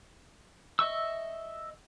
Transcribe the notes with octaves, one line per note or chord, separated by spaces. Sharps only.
D#5 E5 C#6 E6